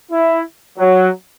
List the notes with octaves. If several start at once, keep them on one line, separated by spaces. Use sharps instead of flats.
E4
F#3